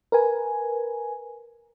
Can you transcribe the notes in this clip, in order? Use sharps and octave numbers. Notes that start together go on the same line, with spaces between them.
A#4 B4 G#5